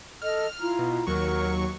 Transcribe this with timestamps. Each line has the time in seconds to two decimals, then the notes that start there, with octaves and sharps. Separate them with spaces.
0.22 A4 D#5 F6
0.60 E4 F4 A#5
0.79 B2
1.07 D#2 F#3 A#4 C#6